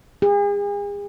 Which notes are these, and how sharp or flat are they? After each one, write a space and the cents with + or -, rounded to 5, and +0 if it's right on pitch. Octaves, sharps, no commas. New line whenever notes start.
G#4 -40